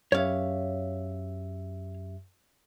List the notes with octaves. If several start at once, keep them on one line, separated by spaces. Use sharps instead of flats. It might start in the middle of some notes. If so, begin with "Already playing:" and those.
F#2 G4 C#5 E5 F5